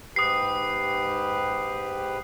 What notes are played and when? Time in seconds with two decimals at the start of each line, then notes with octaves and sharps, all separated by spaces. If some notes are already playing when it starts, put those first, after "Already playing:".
0.16 G#2 G4 B4 D#6 C7